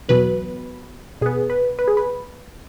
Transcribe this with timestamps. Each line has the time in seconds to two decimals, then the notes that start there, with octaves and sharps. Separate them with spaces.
0.09 E2 B2 F#3 B3 B4
1.21 B2 B3 G#4
1.50 B4
1.79 B4
1.88 G#4
1.97 B4